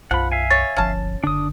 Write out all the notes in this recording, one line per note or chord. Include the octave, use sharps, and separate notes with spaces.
B1 F#2 F3 F#5 B5
E5 F5 G#5
C#5 A6
D1 G1 F3 C#4 A5
F#1 D3 D4 D#6